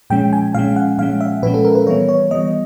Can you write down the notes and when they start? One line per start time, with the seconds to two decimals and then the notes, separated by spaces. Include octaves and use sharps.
0.10 A#2 F3 G#3 C#4 G5
0.33 G#5
0.54 A#2 F3 G#3 C#4 F5
0.76 F#5
0.98 A#2 F3 G#3 C#4 F5
1.21 E5
1.42 A#2 F3 G#3 C#4 B4
1.54 A4
1.65 A#4
1.75 B4
1.86 E3 G3 B3 C#5
2.09 C#5
2.31 E3 G3 B3 D#5